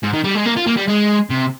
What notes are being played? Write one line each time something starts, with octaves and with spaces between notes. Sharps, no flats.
G#2
D#3
G3
G#3
A#3
F4
A#3
G3
G#3
C3